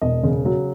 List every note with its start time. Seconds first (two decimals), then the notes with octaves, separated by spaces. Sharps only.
0.01 E1 D#5
0.23 C#3
0.45 F#3